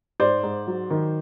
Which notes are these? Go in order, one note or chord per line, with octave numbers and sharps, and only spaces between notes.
G#2 C5 D5
G#2
F#3
D#3